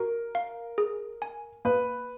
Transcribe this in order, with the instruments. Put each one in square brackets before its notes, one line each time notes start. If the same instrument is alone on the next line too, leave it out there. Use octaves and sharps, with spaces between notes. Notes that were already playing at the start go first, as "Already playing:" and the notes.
Already playing: [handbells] F#4 [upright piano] A#4
[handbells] F5
G#4
G#5
[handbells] A#3 [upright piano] B4